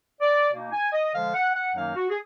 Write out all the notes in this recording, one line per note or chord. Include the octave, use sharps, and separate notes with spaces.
D5
B2 A#3 D#4
G#5
D#5
D3 F3 G#3 F5
F#5
F#5
F#2 D#3 F#3 A#3 D#4 F5
F#4
G#4